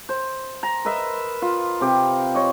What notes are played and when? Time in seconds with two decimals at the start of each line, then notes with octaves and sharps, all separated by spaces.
0.09 C5
0.63 A#5
0.85 A#4 B4 D#5 E5
1.42 F4
1.81 C3 G4
2.35 C#5 D#5